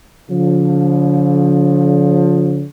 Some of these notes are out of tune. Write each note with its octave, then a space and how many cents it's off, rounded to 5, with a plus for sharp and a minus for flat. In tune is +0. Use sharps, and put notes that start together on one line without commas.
D3 -45 F3 +20